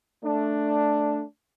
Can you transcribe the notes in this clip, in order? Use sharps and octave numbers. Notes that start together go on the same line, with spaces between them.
A3 D4